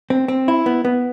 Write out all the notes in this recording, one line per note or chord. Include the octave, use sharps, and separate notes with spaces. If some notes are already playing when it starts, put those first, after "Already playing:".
C4
C4
E4
B3
B3